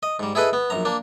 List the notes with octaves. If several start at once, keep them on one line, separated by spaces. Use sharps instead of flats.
D#5
G#2 G3
E4 G#4 A4 B4 D#5
B3
A#1 F#2 A#5
A#3 D4